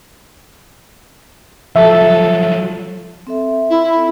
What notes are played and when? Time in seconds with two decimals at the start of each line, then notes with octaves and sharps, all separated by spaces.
1.76 F3 F#3 A4 E5
3.27 C4 A4 E5
3.70 E4